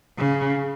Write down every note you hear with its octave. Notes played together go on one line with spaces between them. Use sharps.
C#3